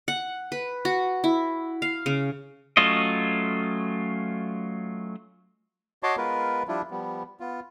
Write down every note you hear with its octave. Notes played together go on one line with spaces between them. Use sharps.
F#5
B4
F#4
E4
F5
C#3
F#3 A3 C#4 F4 D#5
F#4 C#5 D#5 A5 C6 D6
G#3 B3 F4 A#4 B4
F3 G3 D4 E4 F4
F3 G3 B3
B3 F4